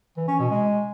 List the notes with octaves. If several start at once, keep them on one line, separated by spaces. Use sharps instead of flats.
E3
C#4
B2
G#3